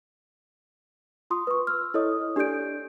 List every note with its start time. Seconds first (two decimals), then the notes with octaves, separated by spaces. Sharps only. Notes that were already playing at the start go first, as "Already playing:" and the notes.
1.30 F4 C6 D#6
1.47 B4 C#6
1.67 E6 F6
1.94 E4 A4 C#5 D#5 D#6
2.36 D4 G4 A4 D5 G6 D7